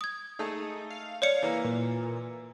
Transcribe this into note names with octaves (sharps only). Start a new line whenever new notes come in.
D#6 G#6
A3 D#4 G#4 A4
F5
C#5 D5 F5 C#7
E3 A#3
A#2